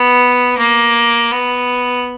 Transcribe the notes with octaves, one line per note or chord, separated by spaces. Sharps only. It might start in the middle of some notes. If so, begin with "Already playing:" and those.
Already playing: B3
A#3
B3